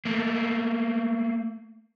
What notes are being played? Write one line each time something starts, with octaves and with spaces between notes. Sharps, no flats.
A3 A#3